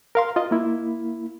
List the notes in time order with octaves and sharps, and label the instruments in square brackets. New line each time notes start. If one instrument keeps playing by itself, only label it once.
[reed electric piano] A#4 F5 C6
F4 D#5
A#3 E4